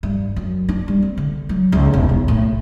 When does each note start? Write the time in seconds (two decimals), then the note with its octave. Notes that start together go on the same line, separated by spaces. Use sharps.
0.03 G2
0.36 F#2
0.69 D4
0.88 G3
1.02 C4
1.17 D3
1.49 F#3
1.72 C#2
1.93 E1
2.09 B1
2.28 A2